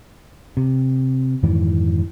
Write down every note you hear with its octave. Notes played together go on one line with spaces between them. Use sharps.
C3
F2 G#2 D#3 E3